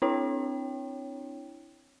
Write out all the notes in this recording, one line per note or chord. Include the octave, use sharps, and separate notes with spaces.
C4 D4 E4 C#5 G5